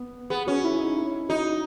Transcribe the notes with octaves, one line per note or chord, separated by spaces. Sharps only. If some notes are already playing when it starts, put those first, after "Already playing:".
Already playing: B3
B3 G#4
C#4 F#4
E4
D#4
E4
D#4 F#4